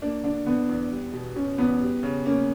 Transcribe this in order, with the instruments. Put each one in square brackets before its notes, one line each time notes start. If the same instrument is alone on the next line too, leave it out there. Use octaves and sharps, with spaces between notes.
[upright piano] A#3 [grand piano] D4
[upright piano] D3 [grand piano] D4
[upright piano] D3 [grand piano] B3
[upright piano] E2
G3
B2
[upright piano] B2 [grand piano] C#4
[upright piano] E2 [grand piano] B3
[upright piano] G3
C#3
[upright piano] A#3 [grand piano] C#4